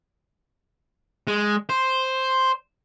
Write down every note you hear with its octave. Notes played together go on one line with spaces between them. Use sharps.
G#3
C5